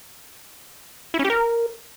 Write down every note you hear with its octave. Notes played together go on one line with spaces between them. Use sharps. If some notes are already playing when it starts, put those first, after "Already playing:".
E4
C#4
G4
A#4